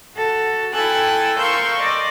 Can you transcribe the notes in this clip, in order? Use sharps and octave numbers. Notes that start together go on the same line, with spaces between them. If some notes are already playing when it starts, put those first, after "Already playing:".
F#4 A4
E4 A4 G5 G#5 E6 F#6
A#4 F5 C6 C#6 E6 G6
D5 D#5